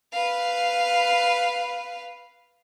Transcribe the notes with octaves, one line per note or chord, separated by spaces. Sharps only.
B4 F5